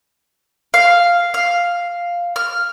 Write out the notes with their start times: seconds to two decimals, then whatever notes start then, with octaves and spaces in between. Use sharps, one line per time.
0.74 F5
1.34 F5
2.36 F6